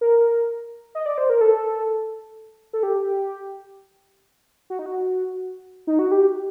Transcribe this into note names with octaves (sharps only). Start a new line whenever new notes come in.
A#4
D#5
D5
C5
A#4
A4
A4
G4
F#4
D#4
F#4
D#4
F#4
G4